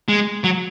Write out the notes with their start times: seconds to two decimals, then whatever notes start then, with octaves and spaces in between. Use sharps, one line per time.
0.08 G#3
0.44 F#3